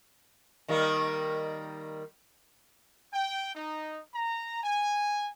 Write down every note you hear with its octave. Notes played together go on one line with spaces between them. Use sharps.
D#3 G3 A#3
G5
D#4
A#5
G#5